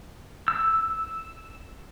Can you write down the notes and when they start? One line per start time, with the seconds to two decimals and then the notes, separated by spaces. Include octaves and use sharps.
0.48 E6